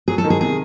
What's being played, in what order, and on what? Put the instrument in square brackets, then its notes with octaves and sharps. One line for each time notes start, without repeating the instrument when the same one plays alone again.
[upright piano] F#3 [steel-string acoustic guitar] G#4
[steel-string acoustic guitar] A4
[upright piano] D#3
[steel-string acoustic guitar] G#4
[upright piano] C3 [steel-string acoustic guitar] G#4